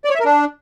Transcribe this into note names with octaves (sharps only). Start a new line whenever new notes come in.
D5
C#5
E5
A#4
D4